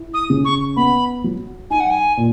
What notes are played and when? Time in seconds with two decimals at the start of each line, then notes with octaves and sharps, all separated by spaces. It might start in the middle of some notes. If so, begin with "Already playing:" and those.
Already playing: E4
0.14 D#6
0.30 C#3
0.45 C#6
0.76 B3 B5
1.24 F#3
1.70 D#4 G#5
1.80 F#5
1.90 G#5
2.17 A#2